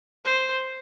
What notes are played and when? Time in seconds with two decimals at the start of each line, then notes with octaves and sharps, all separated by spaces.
0.25 C5